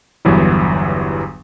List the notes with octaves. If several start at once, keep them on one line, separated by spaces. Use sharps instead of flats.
G1 E2 E3 F#3 G3